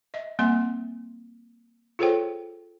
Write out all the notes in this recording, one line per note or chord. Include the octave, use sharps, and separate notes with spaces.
D#5 E5
G3 A#3 C4 E5 G#5 C6
F4 G#4 A4 C5 C#5 G5